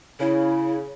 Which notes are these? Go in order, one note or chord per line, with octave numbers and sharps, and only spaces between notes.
C#3 E4